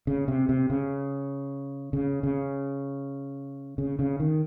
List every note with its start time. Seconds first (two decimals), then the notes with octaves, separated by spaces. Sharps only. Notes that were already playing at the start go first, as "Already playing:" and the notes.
0.07 C#3
0.28 C3
0.49 C3
0.70 C#3
1.93 C#3
2.23 C#3
3.78 C#3
3.99 C#3
4.20 D#3